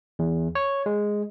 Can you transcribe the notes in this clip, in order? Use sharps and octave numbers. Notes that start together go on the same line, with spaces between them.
E2
C#5
G#3